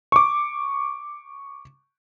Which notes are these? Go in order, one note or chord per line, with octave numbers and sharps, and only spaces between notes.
C#6 D6